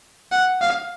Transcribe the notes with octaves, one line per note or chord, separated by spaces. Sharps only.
F#5
F5